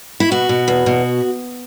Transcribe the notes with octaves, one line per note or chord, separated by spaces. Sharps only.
E4
B2 F#4
B2
E2
B2